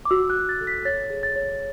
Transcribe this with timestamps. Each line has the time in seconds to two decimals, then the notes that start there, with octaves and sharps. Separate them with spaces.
0.05 D6
0.10 F#4 E6
0.30 F#6
0.36 F#4
0.49 A6
0.60 A4
0.67 B6
0.85 C#5 A6
1.10 G#4
1.23 A6
1.36 C#5